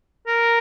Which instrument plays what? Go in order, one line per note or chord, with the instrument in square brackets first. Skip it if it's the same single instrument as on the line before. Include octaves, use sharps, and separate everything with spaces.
[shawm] A#4